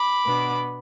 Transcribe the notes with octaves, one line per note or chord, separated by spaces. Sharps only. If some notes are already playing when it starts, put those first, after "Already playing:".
Already playing: B5 D6
B2 B3 D4